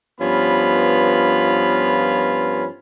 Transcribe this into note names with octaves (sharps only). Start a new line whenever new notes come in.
G2 F3 B3 C#4 F4 B5